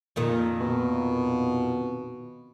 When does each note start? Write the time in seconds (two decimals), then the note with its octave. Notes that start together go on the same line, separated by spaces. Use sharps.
0.16 F2 A#2 D#3
0.61 B2